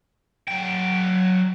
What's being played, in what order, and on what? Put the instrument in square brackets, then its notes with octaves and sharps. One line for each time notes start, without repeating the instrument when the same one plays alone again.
[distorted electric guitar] F#3 G5